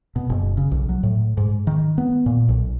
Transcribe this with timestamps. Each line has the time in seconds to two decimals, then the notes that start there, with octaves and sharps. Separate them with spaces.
0.16 B2
0.30 F#1
0.57 C#3
0.72 B1
0.89 F#3
1.03 A2
1.37 G#2
1.67 D#3
1.98 B3
2.26 A#2
2.49 B1